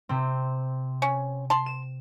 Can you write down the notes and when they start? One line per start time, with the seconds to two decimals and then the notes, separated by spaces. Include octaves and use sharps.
0.09 C3 C4
1.02 C#4
1.50 A5 C6
1.66 E7